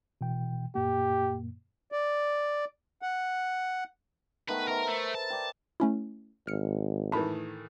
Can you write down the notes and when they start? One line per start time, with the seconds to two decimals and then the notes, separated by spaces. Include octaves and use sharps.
0.21 B2 E3 G5
0.75 F#2 A#2 A#3 G4
1.92 D5
3.02 F#5
4.49 D#3 A3 B3 B4
4.68 A#4 C5 E5 A#5
4.88 A3
5.15 A5
5.30 D5 G5
5.80 A3 C#4 E4
6.47 G#1 F6 C#7
7.12 A2 D#3 E3 A5 B5